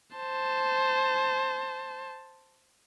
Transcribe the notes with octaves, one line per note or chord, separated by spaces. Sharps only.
C5 A5